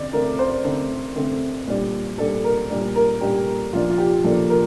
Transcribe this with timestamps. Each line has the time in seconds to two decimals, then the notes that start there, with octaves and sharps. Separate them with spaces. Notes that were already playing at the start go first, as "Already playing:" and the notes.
Already playing: D3 A3 C4 D5
0.13 D3 A3 C4 A#4
0.39 C5
0.65 D3 A3 C4 A4
1.16 D3 A3 C4
1.67 A#2 G3 D4
2.18 A#2 G3 D4 A4
2.44 A#4
2.70 A#2 G3 D4
2.96 A#4
3.21 A#2 G3 D4 G4
3.73 A#2 F3 A#3 D4 F4
3.90 F4
3.98 G4
4.24 A#2 F3 A#3 D4 A4
4.50 A#4